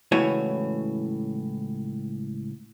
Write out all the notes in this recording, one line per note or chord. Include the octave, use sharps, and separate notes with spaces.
C#2 A2 E3 F#4 C#5 G#5